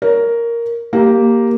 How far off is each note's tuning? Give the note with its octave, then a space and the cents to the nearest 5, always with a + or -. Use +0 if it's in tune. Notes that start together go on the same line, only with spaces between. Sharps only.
A#4 +0 C#5 +30
A#3 +0 G4 +0